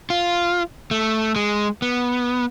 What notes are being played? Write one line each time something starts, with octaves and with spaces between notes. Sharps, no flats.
F4
A3
G#3
B3